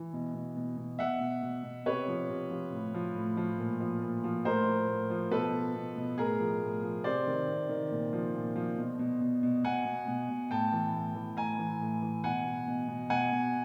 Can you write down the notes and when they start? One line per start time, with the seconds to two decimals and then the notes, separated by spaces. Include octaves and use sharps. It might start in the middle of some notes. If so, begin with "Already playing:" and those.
Already playing: E3
0.13 B2
0.35 B2
0.56 B2
0.77 B2
0.99 B2 E5 F#5
1.20 B2
1.43 B2
1.64 B2
1.86 C3 B4 C#5
2.08 F3
2.29 C3
2.51 F3
2.72 A2
2.94 F3
3.16 A2
3.37 F3
3.58 A#2
3.80 F3
4.01 A#2
4.24 F3
4.45 A2 A#4 C5
4.67 F3
4.88 A2
5.10 F3
5.31 B2 A4 B4
5.53 B2
5.75 B2
5.97 B2
6.18 A2 G#4 A#4
6.40 F3
6.62 A2
6.83 F3
7.04 C3 C5 D5
7.27 D#3
7.48 C3
7.69 D#3
7.91 A#2
8.13 F3
8.35 A#2
8.56 F3
8.78 B2
8.99 B2
9.21 B2
9.43 B2
9.64 B2 F#5 G#5
9.85 B2
10.08 B2
10.29 B2
10.51 A2 G5 A5
10.73 E3
10.94 A2
11.15 E3
11.37 A2 G#5 A#5
11.59 E3
11.81 A2
12.02 E3
12.24 B2 F#5 G#5
12.45 B2
12.68 B2
12.88 B2
13.10 B2 F#5 G#5
13.32 B2